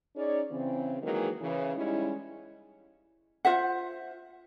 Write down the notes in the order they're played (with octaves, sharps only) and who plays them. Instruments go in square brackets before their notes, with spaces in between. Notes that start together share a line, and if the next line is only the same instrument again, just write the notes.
[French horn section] C#4 D#4 G#4 C#5 D5
C#3 E3 C4
D#3 E3 F#3 G#3 A#3 G#4
C#3 E3
G3 G#3 C#4 D#4 E4
[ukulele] F4 C5 E5 F#5